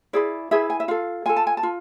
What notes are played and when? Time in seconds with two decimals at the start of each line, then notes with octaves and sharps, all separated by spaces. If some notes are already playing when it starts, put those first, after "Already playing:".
0.13 E4 G#4 B4 D5
0.51 E4 G#4 B4 E5
0.70 G#5
0.80 E5
0.88 F4 A4 F5
1.26 F4 A4 G#5
1.37 A5
1.47 G#5
1.57 A5
1.63 F4